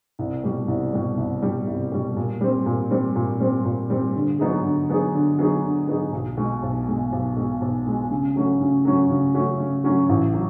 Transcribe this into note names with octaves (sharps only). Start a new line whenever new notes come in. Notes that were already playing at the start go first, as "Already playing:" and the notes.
C2
B2 G3
C2
B2 G3
C2
B2 G3
C2
B2 G3
A#2
G3 C4
A#2
G3 C4
A#2
G3 C4
A#2
G3 C4
D3
F#3 B3 D#4 G#4
D3
F#3 B3 D#4 G#4
D3
F#3 B3 D#4 G#4
D3
F#3 B3 D#4 G#4
B1
B2 G#3
B1
B2 G#3
B1
B2 G#3
B1
B2 G#3
C#3
F#3 A3 C#4 F#4
C#3
F#3 A3 C#4 F#4
C#3
F#3 A3 C#4 F#4
C#3
F#3 A3 C#4 F#4
A1
F#3